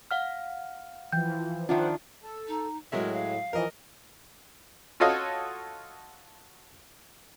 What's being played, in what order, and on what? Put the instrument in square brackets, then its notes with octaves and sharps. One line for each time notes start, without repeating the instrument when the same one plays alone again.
[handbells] F5 F#5 F6
[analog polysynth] E3 F3 [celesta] G5 G6
[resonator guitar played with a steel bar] D#3 F3 D4 [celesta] F4 E5 [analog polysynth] C5 F#5
[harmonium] A4
[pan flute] D#4
[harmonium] A2 [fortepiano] F#3 G#3 E5 [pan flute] A#4
[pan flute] F5
[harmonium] E3 F3 [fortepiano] A#4 D#5
[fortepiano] F4 F#4 A4 C#5 D#5 F5